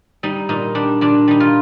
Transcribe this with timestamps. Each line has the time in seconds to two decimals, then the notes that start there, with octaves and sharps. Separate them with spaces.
0.23 G3 D#4
0.49 A#2 D#4
0.75 G3 D4
1.01 A#2 D4
1.28 G3 D#4
1.40 F4